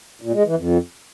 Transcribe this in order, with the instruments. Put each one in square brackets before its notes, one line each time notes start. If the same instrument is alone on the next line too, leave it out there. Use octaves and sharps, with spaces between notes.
[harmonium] A#2
G#3
E3
F2